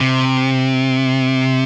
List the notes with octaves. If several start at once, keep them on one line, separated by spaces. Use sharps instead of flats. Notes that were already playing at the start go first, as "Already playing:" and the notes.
C3